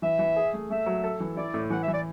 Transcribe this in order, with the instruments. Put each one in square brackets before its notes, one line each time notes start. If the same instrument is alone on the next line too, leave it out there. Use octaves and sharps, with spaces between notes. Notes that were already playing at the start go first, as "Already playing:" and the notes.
[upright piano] E3 [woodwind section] E5
[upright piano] E3
G#4
A3
[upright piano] A3 [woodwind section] E5
[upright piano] F#3
A4
E3
[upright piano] E4 [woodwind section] D5
[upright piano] A2
[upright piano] E3 [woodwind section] F#5
[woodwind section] E5
[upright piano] E3 [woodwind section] D5